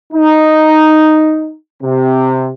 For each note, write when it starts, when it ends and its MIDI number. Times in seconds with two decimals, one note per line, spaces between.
0.13 1.55 63
1.83 2.51 48